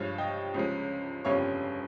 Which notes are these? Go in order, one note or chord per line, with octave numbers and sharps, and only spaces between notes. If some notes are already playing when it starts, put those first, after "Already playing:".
Already playing: G2 F3 G#3 C#5 F5
D#5 G5
C#2 C#3 F3 G#3
G1 F2 C#3 G3 C#5 F5